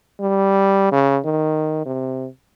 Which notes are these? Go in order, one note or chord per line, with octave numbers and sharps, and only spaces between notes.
G3
C#3
D#3
C3